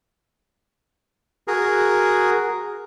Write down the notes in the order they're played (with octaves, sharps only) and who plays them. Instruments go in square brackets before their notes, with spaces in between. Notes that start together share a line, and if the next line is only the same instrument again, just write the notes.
[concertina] F#4 G#4 A#4